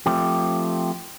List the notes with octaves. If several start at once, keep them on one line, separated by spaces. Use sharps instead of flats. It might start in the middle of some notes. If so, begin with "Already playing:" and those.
F3 A3 C4 G4